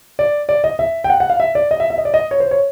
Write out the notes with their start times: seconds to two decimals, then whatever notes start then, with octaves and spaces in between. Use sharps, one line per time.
0.19 D5
0.49 D5
0.64 D#5
0.79 E5
1.04 G5
1.10 F#5
1.20 F#5
1.30 F5
1.40 E5
1.55 D5
1.71 D#5
1.80 E5
1.90 E5
1.98 D#5
2.05 D5
2.14 D#5
2.31 C#5
2.40 C5
2.51 C#5